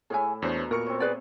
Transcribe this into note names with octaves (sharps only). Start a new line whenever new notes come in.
A2 E4 G#4 C#5 G#5
E2 B2 D4 C5 C#5 A#5
A#2 A#4 C#6 C#7
C4 C#5
G#4 B4 D5